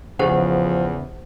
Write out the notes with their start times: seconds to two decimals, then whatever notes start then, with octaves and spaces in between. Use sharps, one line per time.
0.19 E2 C#3 F3 G4 C5 F#5